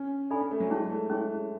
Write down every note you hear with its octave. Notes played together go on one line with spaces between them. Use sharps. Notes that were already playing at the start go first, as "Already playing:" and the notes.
Already playing: C#4
D4 A4 D5 G#5 B5
C#4
A3
F#3
G#3 C#4 E4 G#4 C#5
A3
G#3 C#4 E4 G#4 C#5